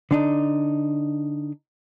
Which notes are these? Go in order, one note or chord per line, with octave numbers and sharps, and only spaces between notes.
D3 D4 D#4